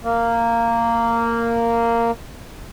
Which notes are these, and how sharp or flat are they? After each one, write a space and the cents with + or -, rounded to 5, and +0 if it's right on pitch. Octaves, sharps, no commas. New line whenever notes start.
A#3 -10